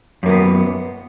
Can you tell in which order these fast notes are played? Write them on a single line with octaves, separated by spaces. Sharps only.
F#2 A#3 B3